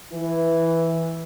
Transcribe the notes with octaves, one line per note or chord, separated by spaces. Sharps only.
E3